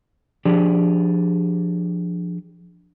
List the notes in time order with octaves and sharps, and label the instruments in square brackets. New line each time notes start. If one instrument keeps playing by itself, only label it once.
[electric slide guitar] F3 D4 G4 G#4 D5